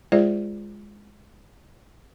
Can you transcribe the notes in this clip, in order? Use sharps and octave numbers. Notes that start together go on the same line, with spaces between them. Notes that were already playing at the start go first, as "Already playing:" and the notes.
G#3 F4 G#4 C5 D5 E5